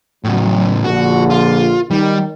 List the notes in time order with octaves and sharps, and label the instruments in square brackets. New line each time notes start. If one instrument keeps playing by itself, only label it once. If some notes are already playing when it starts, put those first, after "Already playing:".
[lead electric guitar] A2 C#3 [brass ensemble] F#3
[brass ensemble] A#1 D3 [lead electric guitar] F#4
[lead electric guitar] F4
[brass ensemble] D#3 [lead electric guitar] G3